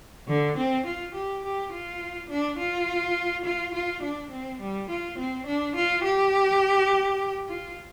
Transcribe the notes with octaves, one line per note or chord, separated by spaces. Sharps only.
D3
C4
F4
G4
G4
F4
D4
F4
F4
F4
D4
C4
G3
F4
C4
D4
F4
G4
F4